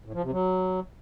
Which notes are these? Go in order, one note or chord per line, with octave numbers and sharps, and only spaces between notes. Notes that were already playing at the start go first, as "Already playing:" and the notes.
A2
F3
C3
F#3